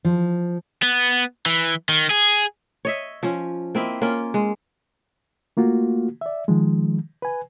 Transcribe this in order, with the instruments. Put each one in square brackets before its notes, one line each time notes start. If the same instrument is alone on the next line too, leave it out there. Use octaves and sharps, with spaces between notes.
[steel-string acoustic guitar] F3
[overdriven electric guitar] B3
E3
D#3
G#4
[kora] C#5 D#5 E5
F3 C#4
A#3 C4 E4 D#5
A#3 C#4 F4
G#3
[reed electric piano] A3 A#3 F4 F#4
D5 E5
D#3 F3 G#3
B4 G#5